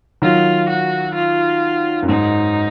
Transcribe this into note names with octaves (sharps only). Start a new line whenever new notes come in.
D#3 F#3 F4
F#4
F4
F#2
G#2 D#4